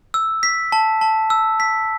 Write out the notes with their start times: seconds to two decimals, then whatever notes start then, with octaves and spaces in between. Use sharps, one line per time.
0.14 E6
0.43 B6
0.72 A5
1.01 A5
1.30 E6
1.60 B6